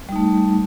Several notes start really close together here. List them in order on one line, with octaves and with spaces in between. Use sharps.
G3 D#4 A3